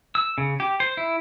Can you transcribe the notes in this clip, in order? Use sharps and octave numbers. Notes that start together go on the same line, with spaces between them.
E6
C#3
G4
C5
E4